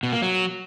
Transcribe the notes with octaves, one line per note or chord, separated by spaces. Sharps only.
B2
A#3
F#3